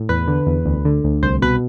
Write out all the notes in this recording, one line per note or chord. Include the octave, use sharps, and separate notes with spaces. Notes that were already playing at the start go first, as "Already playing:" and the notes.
Already playing: A2
E2 B4
D3
E2
D2
D3
D2
C2 C5
B2 B4